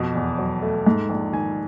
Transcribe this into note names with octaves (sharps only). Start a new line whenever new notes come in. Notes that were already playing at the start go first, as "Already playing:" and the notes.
Already playing: F2 B2
E2
F#3
A3
G#2
A#1
D#3 G#5